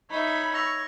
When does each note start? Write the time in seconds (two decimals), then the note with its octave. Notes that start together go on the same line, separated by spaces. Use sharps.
0.10 D#4 C#5 E5 B5
0.54 C#6 E6 A#6 F7